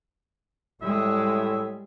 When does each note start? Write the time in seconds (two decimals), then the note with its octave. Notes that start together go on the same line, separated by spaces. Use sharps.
0.82 A2 G3 G#3 E5